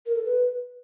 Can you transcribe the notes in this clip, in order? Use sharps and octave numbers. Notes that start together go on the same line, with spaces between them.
A#4
A4
B4